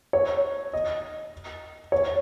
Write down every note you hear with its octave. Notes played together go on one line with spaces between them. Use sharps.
C#5
D#5
C#5